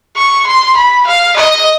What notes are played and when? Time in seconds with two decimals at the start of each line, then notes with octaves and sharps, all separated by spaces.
0.16 C#6
0.47 C6
0.77 B5
1.07 F5
1.36 D#5